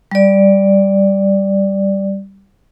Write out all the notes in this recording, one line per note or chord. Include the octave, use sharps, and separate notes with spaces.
G3 D5